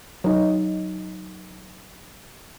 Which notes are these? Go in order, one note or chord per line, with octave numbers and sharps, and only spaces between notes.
F#3 D#4